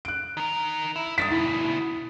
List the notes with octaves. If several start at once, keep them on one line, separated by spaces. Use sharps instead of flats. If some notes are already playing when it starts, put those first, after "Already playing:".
F#6 D7
D#3 A#4
E4
G2 D#6 A6 B6
D2 B2 E4